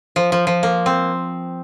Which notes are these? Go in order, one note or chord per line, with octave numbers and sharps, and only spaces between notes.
F3
F3
F3
A#3
C4